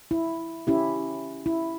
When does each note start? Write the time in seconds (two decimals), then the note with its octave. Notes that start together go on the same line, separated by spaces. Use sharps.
0.11 E4
0.67 C#4 E4 G4
1.46 E4